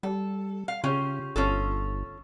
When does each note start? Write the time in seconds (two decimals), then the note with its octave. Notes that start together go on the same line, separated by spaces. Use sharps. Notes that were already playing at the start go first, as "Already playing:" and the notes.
0.03 G3 A4
0.68 F5
0.84 C#3 C#4 F4 G4
1.36 G1 C#4 F4 A4